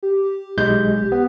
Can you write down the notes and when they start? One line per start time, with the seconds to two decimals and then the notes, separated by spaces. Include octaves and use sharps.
0.03 G4
0.58 B1 G#3 G6
1.12 B3